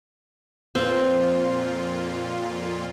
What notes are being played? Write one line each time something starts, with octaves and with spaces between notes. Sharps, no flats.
F2 A#2 C4 F4